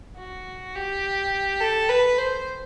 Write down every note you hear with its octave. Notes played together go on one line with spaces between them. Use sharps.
F#4
G4
A4
B4
C5